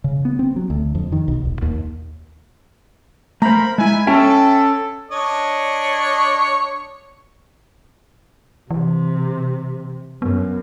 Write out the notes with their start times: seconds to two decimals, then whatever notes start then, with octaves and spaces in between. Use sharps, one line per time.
0.04 C#3
0.25 B3
0.39 C4
0.56 F#3
0.70 D2
0.95 F2
1.12 D#3
1.28 B1
1.45 D#1
1.62 D#2
3.42 A3 A#4 C5 F5 A#5 B5
3.78 G#3 E4 E5 G#5
4.07 C#4 A4 E5 G5 A5
5.11 D4 C#5 D#5
8.71 C3 E3
10.22 F#2 B3